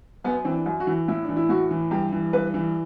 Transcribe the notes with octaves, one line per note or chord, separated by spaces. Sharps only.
F#2 B3
E3 C4
D4
F#2
F#4
E3
A2 E4
E3 D4
E4
A2 F#4
E3
G2 G4
E3
G2 B4
E3